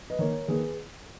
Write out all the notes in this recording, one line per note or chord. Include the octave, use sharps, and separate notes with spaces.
B4 D#5
D#3 A#3 A#4 C#5
D#3 A#3 G#4 B4